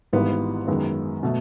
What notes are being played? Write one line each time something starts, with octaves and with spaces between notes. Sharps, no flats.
G#1 G#2 E3 G3 B3
F#2 D#3 G#3 B3
B2 F#3 A3